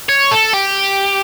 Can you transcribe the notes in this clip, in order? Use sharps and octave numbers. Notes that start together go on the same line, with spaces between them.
C#5
A4
G4